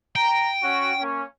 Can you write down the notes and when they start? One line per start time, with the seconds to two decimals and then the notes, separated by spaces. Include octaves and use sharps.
0.16 G5 A#5
0.62 C#4 F#4
0.99 A#3 C#4